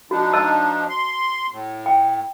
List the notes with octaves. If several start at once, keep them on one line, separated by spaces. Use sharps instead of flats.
F3 D4 D#4 F#4
D#5 A5 E6
C6
A2
G5